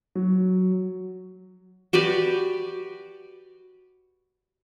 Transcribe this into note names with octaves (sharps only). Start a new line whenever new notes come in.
F#3
F#4 G4 B4 D5